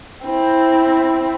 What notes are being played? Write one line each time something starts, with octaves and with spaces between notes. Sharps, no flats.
C4 E4